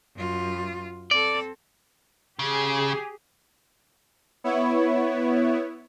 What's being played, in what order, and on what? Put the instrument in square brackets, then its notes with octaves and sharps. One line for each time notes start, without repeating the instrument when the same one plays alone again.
[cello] F#2 F4
[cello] C4 A4 [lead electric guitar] D5
[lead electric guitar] C#3 [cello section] G4 G#4
[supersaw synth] B3 E4 C#5